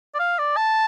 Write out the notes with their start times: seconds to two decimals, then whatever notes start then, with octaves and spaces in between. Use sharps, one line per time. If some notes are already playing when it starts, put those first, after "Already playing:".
0.15 D5
0.19 F5
0.38 D5
0.57 A5